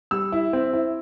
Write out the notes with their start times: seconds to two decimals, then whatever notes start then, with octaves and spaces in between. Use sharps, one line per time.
0.11 G3 E6
0.32 E4
0.53 C4
0.73 E4